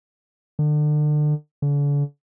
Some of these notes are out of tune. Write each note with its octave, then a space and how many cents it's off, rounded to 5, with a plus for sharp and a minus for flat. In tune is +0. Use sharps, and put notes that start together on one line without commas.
D3 +35
D3 -40